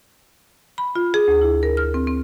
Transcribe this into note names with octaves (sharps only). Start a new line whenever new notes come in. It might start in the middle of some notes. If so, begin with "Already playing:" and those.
B5
F4
G#4
D2
E4
A#4
F6
C4
C4